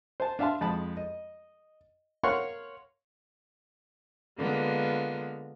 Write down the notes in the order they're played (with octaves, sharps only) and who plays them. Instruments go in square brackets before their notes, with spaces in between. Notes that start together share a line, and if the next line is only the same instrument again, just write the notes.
[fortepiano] C5 G#5 A5
D4 E5 F5 A5 C6
F2 G#3 A5 B5
D#5
A#4 C#5 F5 F#5 C6 C#6
[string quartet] D3 G#3 A#3 B3 F4